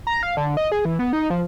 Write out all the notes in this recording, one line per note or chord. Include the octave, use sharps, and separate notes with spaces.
A#5
F5
D3
D#5
G#4
E3
B3
D#4
F3